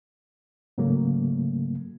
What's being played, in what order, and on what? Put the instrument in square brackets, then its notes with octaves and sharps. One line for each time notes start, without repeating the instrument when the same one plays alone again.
[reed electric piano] G#2 C#3 F#3 A3 A#3